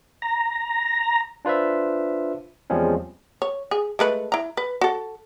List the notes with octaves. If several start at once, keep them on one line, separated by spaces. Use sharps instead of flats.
A#5
D4 F4 B4 C5 E5
E2 F3 G3 G#3 C4 C#4
C#5
G#4
G#3 A3 B4
E4 A#5
B4
F#4 A4